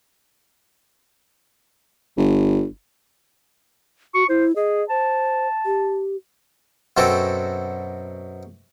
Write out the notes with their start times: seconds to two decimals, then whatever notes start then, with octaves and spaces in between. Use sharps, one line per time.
2.18 G1
4.14 F#4 C#6
4.29 E4 C5
4.56 G#4 D#5
4.89 C5 A5
5.66 G4
6.97 F#2 B2 C4 F#4 A4 D6